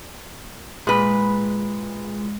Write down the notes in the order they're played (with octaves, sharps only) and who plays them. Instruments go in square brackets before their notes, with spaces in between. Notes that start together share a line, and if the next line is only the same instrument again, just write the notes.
[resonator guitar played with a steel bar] A#2 B4 [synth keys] G#3